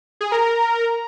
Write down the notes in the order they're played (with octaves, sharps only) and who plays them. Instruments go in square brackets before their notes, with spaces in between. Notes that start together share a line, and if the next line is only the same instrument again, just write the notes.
[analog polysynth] G#4
[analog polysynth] A#4 [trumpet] A#5